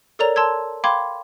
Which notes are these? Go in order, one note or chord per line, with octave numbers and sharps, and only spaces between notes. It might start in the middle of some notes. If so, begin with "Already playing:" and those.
A4 A#4 C#5 D5 A#5 F7
A5 C6 E6 G#6
F5 G5 B5 C6 D6 G#6